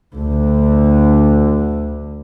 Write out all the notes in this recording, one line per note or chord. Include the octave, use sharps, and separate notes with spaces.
D2 D3